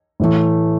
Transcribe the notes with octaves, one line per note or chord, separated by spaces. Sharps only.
A2 E3 A3